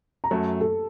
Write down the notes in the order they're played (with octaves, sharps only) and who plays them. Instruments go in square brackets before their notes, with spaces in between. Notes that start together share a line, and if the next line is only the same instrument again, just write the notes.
[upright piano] A#5
[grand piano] F#2 F#3 A3 [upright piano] A5
[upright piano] A4